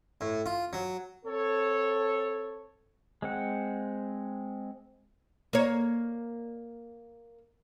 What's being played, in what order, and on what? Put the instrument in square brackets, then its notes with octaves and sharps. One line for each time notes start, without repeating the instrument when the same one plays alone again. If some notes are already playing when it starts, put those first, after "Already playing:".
[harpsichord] A2
F4
F#3
[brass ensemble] C4 A4 C#5
[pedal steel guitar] G#3 C4 F#5
[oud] A#3 C#5